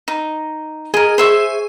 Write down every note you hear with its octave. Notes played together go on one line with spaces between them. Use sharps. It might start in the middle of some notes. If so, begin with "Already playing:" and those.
D#4
G#4 A#4 D#5
C5 E5 C#6